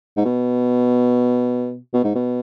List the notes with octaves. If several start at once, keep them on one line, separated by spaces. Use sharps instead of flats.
G#2
B2
B2
G#2
B2